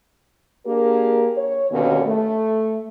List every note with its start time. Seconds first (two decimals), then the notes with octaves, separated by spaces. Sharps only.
0.65 A#3 D4 G4 G#4 A#4
1.36 C#5
1.71 D#2 B2 D3 D#3 B3 C#4
2.06 A3